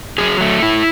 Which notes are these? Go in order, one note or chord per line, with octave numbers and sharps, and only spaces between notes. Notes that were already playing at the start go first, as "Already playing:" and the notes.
F#3 G#4
A3
E4